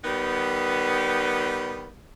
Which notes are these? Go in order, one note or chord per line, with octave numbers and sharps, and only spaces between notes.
D#3 G3 B3